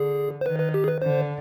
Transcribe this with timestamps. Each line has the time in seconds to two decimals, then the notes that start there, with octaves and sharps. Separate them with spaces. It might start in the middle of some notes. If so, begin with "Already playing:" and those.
Already playing: D3 G#4
0.41 C5
0.46 D#3 B4
0.60 B4
0.74 G4
0.84 G#4
0.88 B4
1.02 D3 C5